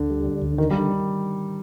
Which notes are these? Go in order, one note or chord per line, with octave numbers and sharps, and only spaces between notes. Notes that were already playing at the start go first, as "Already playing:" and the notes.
Already playing: D2 D3
G3
D3
D2
D3 D#3
G3